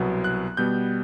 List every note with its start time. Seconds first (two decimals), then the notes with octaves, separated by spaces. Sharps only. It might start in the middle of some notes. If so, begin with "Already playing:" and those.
Already playing: C2 B2 F#3 B3
0.24 F#6
0.57 B2 G3 B3 G6